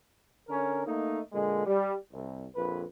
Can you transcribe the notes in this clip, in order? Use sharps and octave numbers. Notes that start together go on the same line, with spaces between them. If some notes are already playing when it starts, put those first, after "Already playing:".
D3 C#4 A#4
A3 A#3 D#4
A#2 D3 G#3
G3
C2
A#1 F2 B4